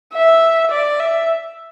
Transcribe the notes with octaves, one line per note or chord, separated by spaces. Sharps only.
E5
D5
E5